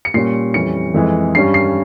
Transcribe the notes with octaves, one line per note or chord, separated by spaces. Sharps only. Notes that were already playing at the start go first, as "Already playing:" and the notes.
C#7
A#2 G3 C#4 C7
F2 E3 G3 C#4 C#7
F2 E3 G#3
G2 G3 C#4 C7
C7